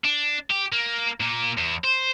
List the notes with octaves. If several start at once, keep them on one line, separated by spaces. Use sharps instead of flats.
D4
G4
A#3
A#2 A#3
E2
C5